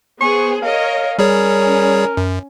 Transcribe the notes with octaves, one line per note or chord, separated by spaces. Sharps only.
B3 G#4 C5 C#6
A#4 C#5 D#5 F5
G3 C#4 G#4 A#4 C#5
F#2